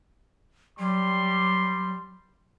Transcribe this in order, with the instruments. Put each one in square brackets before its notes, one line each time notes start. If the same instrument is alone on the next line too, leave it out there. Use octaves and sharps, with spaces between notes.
[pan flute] F#3 [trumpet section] G3 C6